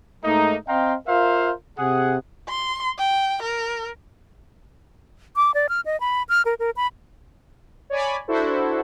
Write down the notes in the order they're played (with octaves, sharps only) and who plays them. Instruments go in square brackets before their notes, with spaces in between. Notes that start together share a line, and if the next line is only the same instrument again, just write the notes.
[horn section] G#2 A3 A#3 D#4
C4 D#5 F5 G5 A#5 C6
F4 A#4 C5 E5 F5
C3 G#4 F#5
[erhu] C6
G5
A#4
[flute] D6
D5
F6
D#5
B5
F6
A#4
A#4
B5
[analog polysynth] C#5 D5 G#5 B5
D4 E4 F#4 A4 C5